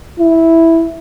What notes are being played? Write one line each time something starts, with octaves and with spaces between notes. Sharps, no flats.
E4